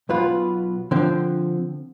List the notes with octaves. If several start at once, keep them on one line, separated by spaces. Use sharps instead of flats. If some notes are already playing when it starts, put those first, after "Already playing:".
B1 B2 B3 F4 B4
D3 F3 C4